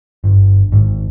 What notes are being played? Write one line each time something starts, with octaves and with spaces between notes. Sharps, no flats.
G1
G#1